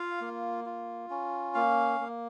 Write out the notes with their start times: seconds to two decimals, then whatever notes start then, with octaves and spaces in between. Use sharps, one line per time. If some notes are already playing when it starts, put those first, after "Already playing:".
Already playing: F4 F5
0.21 A#3
0.66 F4
1.10 C#4
1.54 A#3 F5
2.00 A#3